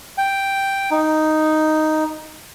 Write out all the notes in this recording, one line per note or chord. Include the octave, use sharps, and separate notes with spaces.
G5
D#4